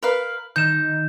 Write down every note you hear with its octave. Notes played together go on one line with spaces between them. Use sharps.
A#4 B4 F5
D#3 D#4 G6 E7